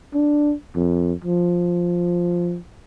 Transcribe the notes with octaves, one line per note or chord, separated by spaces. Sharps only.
D4
F2
F3